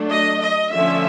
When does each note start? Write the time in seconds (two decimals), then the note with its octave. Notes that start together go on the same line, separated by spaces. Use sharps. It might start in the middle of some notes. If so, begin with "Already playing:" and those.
Already playing: F#3 A3 D4
0.11 D#5
0.41 D#5
0.72 D3 F3 A3 C#4 E5